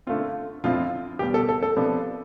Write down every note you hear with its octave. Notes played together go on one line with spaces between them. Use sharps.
D3 A3 C4 F4
F2 D3 F3 C4 E4 F4
E2 B2 G3 G4
A4
A4
A4
C3 F3 B3 D4